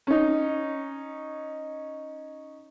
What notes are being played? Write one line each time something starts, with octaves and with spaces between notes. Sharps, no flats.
C#4 D#4